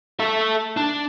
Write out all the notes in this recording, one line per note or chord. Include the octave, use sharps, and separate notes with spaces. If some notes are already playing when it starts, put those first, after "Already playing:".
A4 E5
D4